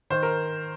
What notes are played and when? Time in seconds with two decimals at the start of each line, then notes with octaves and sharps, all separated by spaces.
0.10 D#3 C5
0.23 A#4